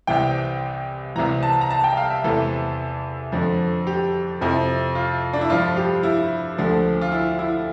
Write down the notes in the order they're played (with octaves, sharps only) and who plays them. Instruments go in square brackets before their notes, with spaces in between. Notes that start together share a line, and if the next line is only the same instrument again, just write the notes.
[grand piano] C2 C3 E3 G5
C2 C3 E3 A#5
A5
A#5
A5
G5
F5
E5
E2 C3 E3 A4
F2 D3 F3
G4
F2 C3 F3 E4
F4
D4
E4
G2 F3 F4
G4
E4
D2 D3 F3
F4
E4
E4